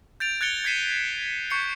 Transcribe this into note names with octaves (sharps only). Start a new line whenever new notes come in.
G6 A6 D7 F7
F#6 G#6 A6 C#7 G7
G#6 A6 B6 C7 D#7 E7
C#6 G6 C7 C#7